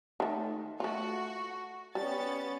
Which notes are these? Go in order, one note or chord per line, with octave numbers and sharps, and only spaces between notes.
D#3 A3
A3 F4 F#4
G3 B3 C#4 A6